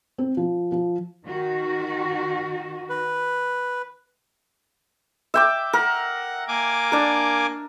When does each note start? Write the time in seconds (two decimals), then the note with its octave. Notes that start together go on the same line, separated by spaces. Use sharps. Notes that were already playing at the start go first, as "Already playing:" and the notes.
0.18 C4
0.37 F3
0.72 F3
1.26 D#3 F#4
2.90 B4
5.34 E5 G5 D6
5.73 A#4 F#5
6.48 A#3 G#5 D6
6.92 D4 A#4